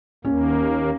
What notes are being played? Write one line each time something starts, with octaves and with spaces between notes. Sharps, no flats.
D#2 A#3 C#4